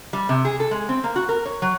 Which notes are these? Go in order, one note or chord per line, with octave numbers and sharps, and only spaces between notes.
G3
C3
G#4
A4
G#3
C4
A#3
F#4
A#4
C#5
F#3